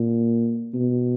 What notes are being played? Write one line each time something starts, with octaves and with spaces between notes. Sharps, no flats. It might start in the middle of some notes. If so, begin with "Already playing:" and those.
Already playing: A#2
B2